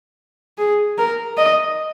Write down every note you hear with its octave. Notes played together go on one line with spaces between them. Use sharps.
G#4
A#4
D#5